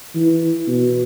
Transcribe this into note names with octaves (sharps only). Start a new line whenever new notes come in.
E3
B2